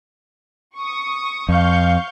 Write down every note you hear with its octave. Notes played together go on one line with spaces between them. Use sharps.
C#6 D#6
F2 F5 C#6 G6